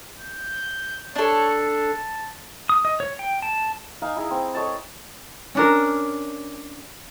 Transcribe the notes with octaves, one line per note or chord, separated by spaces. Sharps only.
G6
D4 A4 C#5
A5
D#6
D#5
C#5
G5
A5
D#4 F5 G#5
E4 G#4 A#5
C4
A4 C#5 D#5 A5
C#4 D4 A#4